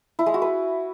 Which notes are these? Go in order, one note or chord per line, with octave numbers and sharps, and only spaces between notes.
E4
G#3
F#4
B4